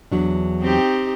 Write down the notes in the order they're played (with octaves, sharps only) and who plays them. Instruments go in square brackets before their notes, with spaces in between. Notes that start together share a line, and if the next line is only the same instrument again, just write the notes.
[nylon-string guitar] E2 F#3 D4
[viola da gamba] C4 D#4 G4